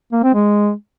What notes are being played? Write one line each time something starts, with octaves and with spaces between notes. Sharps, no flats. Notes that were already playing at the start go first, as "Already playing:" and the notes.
A#3
C4
G#3